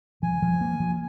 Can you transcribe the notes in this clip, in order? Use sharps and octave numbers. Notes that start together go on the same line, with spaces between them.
F3 G#5
F3
A#3
F3